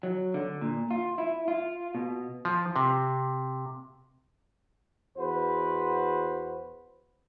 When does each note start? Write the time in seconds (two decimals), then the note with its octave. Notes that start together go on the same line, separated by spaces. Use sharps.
0.03 F#3
0.34 D3
0.61 A#2
0.91 F4
1.18 E4
1.48 F4
1.95 B2
2.45 F3
2.76 C3
5.17 E2 F#4 B4 C5